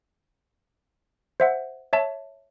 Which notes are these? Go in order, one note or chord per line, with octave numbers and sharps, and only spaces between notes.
C5 E5 F#5
C#5 E5 A5